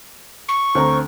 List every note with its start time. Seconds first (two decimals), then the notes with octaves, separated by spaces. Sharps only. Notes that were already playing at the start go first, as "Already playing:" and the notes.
0.49 C#6
0.75 D2 C4 A#5